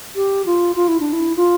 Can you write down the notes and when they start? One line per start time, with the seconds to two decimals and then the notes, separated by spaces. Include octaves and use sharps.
0.16 G4
0.46 F4
0.76 F4
0.88 E4
1.00 D4
1.13 E4
1.36 F4